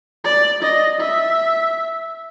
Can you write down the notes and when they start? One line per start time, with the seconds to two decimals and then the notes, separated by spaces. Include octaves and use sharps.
0.24 D5
0.63 D#5
1.01 E5